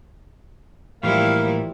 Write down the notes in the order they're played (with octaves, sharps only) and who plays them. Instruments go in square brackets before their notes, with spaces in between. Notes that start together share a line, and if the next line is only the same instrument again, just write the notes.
[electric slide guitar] A2 E3 [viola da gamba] F3 G3 E4 [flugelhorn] A#3 [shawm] F5